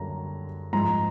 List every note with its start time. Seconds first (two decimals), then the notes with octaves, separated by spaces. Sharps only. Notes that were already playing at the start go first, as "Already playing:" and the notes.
Already playing: F#2 D3 G3 A#3 A#5
0.73 G#2 F3 G#3 A#5